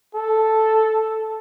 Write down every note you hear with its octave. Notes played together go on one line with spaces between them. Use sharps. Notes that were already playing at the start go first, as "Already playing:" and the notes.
A4